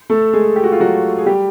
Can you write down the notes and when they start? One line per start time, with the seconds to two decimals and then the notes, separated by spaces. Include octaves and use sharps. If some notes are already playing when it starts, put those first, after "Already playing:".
0.10 A3 A4
0.33 G#3 G#4
0.56 G4
0.64 F#4
0.72 F4
0.80 F#3 F#4
1.18 G#4
1.26 G3 G4